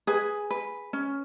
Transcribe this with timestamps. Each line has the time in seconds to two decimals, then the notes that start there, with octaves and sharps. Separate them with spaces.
0.07 G#4 B4 G#5
0.51 B4
0.93 C#4